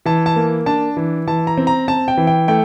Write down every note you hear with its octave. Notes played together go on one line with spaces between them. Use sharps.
E3 A5
A5
A#3
D4 A5
E3
E3 A5
A#5
C4
A#5
C4 A5
G5
E3
G5
A3 G5